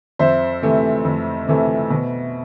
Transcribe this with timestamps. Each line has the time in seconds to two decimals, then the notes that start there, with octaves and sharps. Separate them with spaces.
0.19 F2 C5 E5
0.62 C3 E3 A3
1.05 F2
1.48 C3 E3 A3
1.90 B2